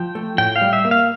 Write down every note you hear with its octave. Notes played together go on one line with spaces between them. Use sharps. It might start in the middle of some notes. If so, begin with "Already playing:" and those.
Already playing: F3 G5
A3
A2 G5
F5
G3
E5
A#3
F5